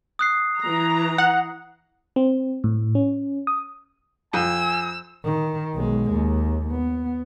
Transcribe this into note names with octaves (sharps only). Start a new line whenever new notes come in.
D#6 F#6 C7
E3 A#5
F#5
C4
A2
C#4
D#6
F2 G#5 E6
D#3
B1 G#3
D#2
B3